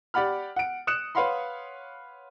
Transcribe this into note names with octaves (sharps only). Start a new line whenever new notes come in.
G4 D5 F#5 B5 F6
F#5 D7
D#6 F#6 C#7 E7
B4 C#5 F5 F#5 B5 C6